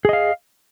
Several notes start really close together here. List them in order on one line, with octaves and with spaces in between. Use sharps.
G#4 D#5 F5